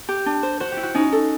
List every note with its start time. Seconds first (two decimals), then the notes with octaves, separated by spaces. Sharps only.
0.09 G4
0.26 D4
0.43 C5
0.60 F#4 C5
0.72 G4
0.77 E4
0.83 F#4
0.95 C#4 D#4
1.12 A4